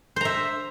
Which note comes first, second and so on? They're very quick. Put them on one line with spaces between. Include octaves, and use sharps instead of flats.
C5 A#5 E5